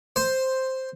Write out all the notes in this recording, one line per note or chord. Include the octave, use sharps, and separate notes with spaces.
C5